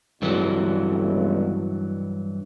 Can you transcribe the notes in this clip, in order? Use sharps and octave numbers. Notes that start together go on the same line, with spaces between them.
G1 C#2 G2 E3 F#3